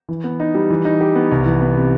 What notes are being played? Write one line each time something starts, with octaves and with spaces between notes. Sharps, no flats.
E3
B3
D#4
G3
E3
D#4
G4
B3
C2
E3
B3
C3